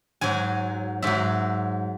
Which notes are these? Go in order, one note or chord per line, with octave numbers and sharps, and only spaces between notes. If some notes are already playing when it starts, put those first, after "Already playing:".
G#2 F#3 G#5
G#2 F#3 E5